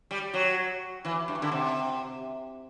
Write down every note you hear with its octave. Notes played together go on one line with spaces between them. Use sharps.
G3
F#3
E3
G2
D3
C3